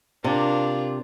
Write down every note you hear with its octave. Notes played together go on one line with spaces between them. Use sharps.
C3 D4 F4 A#4